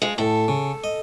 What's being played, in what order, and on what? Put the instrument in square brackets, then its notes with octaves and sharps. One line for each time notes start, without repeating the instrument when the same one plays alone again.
[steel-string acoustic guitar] G#3 F4
[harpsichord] A2 [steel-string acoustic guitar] A4
[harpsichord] C#3
D#5